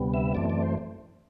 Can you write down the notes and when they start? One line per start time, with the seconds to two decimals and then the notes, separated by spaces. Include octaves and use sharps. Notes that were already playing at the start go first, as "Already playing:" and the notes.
Already playing: D2 C3 G3 B3
0.14 E5
0.35 F#2 E3 A3 C4 D5
0.50 D5
0.62 C5